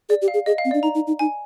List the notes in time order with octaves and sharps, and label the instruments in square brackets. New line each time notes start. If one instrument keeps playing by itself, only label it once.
[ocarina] G#4 [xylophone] D5
[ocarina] G4
[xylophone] F5
[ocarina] G#4
[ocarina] G#4 [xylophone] D#5
[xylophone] F5
[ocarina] C4
[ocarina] D4 [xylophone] D5
[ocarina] D#4 [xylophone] A#5
[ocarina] D#4
D#4
[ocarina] D#4 [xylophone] G#5